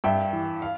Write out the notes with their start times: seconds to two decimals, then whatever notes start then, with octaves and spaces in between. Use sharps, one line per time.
0.04 G2 E5 G5
0.33 E3
0.62 F5